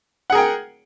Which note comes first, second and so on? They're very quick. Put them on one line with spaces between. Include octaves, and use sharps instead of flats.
F#5 G#4 A#4 G5